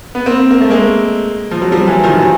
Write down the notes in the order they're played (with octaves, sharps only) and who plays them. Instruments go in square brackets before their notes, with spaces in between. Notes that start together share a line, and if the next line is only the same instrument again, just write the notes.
[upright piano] B3
A#3 C4
A#3
A3
G#3 A#3
F3
F#3
F3 G3
E3 F#3
D#3 F3
E3 F#3